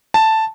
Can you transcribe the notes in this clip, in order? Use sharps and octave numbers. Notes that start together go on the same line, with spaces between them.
A5